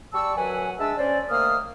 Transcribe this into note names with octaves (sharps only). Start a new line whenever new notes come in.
G3 D5 A5 C#6 E6
F#2 F#3 B4 F#5 G#5
G#3 D4 E5 A5 E6
C#4 C5 D5
D#3 A3 A#3 C5 D#6 F6